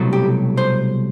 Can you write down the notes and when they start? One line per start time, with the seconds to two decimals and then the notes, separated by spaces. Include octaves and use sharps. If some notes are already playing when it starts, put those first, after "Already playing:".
Already playing: C2 B2 F#3 A3
0.13 G4
0.57 C5